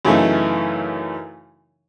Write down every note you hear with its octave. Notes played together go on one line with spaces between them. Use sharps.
F#2 C#3 E3 A3 D#4